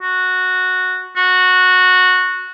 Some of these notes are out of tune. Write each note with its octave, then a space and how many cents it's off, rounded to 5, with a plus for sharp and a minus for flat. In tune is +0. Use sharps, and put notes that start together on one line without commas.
F#4 -5
F#4 -10